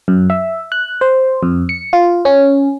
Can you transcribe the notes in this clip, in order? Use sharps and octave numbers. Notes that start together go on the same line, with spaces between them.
F#2
E5
F#6
C5
F2
C#7
F4
C#4